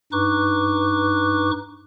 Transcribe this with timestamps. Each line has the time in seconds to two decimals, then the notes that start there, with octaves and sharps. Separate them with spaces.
0.12 G2 D#4 B4 C#6 D6 F#6